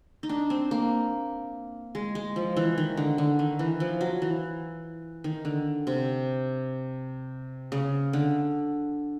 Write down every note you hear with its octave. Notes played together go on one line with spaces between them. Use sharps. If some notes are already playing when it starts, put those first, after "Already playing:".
D#4
D4
C4
A#3
G#3
G#3
F3
E3
D#3
D3
D3
D#3
E3
F3
F#3
E3
D#3
D3
C3
C#3
D3